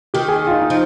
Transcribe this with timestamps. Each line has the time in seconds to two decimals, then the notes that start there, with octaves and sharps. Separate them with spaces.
0.14 D#3 G4
0.28 G#4
0.47 F4
0.51 D#4
0.62 D#4
0.70 F3